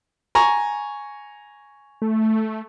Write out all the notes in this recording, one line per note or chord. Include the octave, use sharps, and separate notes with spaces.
G#5 A#5 C#6
A3